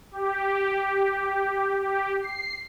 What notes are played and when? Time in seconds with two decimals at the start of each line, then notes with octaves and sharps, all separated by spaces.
0.12 G4
1.80 G4
2.20 C7